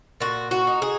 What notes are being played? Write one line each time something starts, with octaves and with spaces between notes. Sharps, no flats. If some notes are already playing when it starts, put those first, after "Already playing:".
A#2 F#4
F#4
D#4
G#4